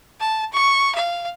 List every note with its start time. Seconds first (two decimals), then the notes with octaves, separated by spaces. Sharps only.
0.20 A5
0.53 C#6
0.95 F5